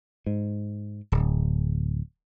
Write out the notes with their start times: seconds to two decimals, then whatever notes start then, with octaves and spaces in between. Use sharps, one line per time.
0.26 G#2
1.12 D1